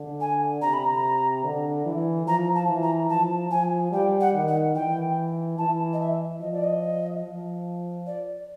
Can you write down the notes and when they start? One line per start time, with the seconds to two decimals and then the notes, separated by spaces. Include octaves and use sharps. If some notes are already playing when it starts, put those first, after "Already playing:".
Already playing: D3
0.21 G#5
0.62 C3 A#5
0.73 B5
0.86 A#5
1.44 D3
1.86 E3
2.27 F3 A#5
2.55 A5
2.69 E3
2.83 A#5
3.10 F3 A5
3.51 F3 G#5
3.92 G3 G5
4.20 F#5
4.34 D#3
4.48 F#5
4.75 E3 G5
5.58 E3 A5
5.93 D#5
6.00 E5
6.41 F3 D#5
6.53 D5
6.64 D#5
7.24 F3
8.06 D5